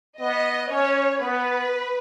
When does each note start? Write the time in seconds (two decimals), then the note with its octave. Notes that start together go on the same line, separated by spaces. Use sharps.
0.20 B3 D#5
0.70 C#4 C#5
1.21 B3 B4